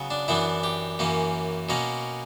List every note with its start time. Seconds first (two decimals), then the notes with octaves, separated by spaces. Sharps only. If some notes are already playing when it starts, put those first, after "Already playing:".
Already playing: C#3 F#3 B3
0.10 D4
0.28 F#2 E3 B3 D4 E4
0.64 G4
0.99 F#2 E3 A#3 C#4
1.69 B2 A#3 C#4 A#4